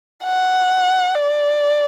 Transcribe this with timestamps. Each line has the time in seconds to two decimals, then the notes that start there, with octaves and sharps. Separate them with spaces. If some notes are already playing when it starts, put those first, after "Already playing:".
0.24 F#5
1.16 D5